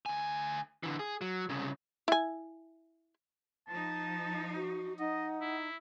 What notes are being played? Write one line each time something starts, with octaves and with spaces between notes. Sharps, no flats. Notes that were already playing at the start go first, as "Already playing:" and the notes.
D2 G#5
D3 E3
G#4
F#3
C2 C#3
E4 G#5
F3 D#4 A5
F#4
D#4 D#5 F#5
E4